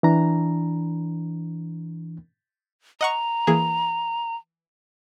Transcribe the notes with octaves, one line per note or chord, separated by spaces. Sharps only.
E3 D4 A#5
D#5 F#5 A#5 C#6
E3 A#3 G#4